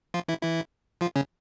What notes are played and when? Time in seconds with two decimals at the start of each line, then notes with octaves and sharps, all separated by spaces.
0.14 F3 F4
0.28 E3 E4
0.43 E3 E4
1.01 F3 F4
1.16 C#3 C#4